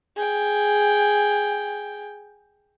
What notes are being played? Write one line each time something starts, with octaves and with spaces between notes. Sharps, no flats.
G#4 G5